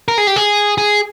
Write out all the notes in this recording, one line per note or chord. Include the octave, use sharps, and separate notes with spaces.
A#4
G#4
G4
G#4
G#4